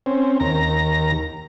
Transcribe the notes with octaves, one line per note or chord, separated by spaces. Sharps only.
C4 C#4
D#2 A#5